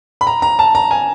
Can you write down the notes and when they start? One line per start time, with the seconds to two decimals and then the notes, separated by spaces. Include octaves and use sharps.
0.21 B5
0.27 A#5
0.42 A#5
0.59 A5
0.75 A#5
0.91 G#5